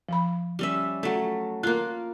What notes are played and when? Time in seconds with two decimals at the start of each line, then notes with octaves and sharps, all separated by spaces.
0.09 F3 B5
0.59 G3 C#4 E5
1.03 F#3 A3
1.63 A#3 F4 F#6